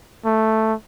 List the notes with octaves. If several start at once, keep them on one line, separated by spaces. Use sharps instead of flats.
A3